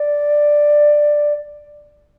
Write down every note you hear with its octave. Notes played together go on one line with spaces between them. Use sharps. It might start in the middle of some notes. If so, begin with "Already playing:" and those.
Already playing: D5